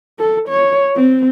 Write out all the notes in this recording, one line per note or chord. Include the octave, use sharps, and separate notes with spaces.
A4
C#5
C4